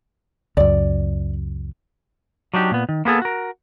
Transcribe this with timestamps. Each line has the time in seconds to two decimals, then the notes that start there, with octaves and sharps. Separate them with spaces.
0.57 C#2 F#2 D5
2.54 F#3 D4 D#4 G4
2.71 A#2 B3
2.89 D#3
3.05 A#3 B3 G#4 A4
3.22 F#4 A#4